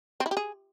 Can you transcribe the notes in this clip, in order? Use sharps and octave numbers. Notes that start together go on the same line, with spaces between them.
C4
E4
G4
G#4